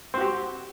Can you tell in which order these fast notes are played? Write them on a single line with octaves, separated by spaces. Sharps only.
C4 F#4 G4